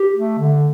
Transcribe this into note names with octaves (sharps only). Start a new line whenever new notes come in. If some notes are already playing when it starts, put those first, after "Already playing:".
Already playing: G4
A3
D3